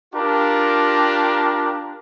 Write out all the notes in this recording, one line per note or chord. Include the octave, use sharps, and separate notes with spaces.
D4 F4 G4 A#4